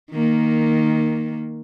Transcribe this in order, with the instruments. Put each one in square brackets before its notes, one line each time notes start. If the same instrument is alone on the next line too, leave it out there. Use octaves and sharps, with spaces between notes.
[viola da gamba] D#3 A#3